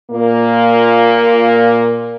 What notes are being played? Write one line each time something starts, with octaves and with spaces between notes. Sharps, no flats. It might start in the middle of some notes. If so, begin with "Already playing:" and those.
A#2 A#3